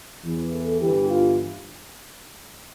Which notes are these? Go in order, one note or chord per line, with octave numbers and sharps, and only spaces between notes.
E2 E3
A4
G1 G2 E3 G4
F4